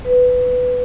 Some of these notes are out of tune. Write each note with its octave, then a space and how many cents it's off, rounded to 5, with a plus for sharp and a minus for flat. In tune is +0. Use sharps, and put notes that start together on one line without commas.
B4 +15